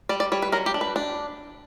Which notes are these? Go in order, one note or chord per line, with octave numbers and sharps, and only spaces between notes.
G3 D5
D5
G3 C#5
B4
F#3 A#4
G4
D4
B4
D4